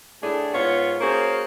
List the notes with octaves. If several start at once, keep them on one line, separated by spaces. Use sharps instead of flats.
A2 A3 D4 G#4
G#2 B3 F4 C#5
A#3 C#4 F#4 G#4 C5